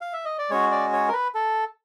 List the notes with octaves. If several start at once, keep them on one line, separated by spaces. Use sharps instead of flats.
F5
E5
D#5
D5
G#3 C#4 F#4 C#5
D5
C#5
A#4
B4
A4